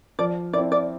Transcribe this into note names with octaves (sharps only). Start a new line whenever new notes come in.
F3 D5
C4 E4 D5
D5